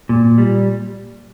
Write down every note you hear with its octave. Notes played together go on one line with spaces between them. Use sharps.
A#2
G3